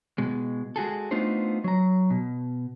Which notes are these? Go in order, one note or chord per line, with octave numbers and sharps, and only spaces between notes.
B2 G#3
G#3 F#4 G#4 A4
A3 B3 D4 D#4 F4 C5
F#3 A#5
B2